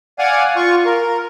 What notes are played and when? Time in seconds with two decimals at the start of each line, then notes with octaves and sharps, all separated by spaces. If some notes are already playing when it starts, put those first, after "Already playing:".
0.19 D5 F5 F#5 G#5
0.56 F4 C#6
0.86 A#4